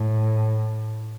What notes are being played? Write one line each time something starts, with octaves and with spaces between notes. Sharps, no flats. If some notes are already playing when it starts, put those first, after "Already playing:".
Already playing: A2